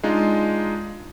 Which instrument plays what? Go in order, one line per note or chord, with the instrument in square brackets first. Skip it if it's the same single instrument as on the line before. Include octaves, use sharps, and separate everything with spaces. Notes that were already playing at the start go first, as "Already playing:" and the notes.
[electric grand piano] G#3 D4 D#4 F4